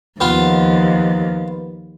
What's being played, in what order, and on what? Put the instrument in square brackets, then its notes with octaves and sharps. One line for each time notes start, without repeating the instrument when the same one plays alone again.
[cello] D#2 F3 [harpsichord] B3 F4